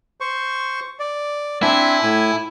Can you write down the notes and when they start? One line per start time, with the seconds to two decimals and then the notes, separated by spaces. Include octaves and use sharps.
0.20 C5 C#6
0.99 D5
1.63 C4 D4 E4 G#5
2.02 A2 G#5